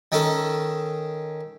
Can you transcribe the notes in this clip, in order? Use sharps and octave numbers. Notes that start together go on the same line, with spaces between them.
D#3 C#4 D#4 A4